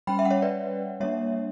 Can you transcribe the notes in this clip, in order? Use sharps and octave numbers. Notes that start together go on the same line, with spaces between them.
G3 C#4 G5 B5
E5 G5
F#5
C#5 E5
B4 D5
G3 A#3 D4 C#5 E5